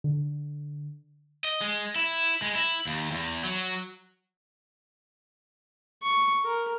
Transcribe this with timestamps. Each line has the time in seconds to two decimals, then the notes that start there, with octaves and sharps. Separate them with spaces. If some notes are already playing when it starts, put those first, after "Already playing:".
0.04 D3
1.44 D#5
1.61 G#3
1.96 E4
2.42 G#3
2.55 E4
2.87 D#2
3.11 E2
3.44 F#3
6.03 C#6
6.44 A#4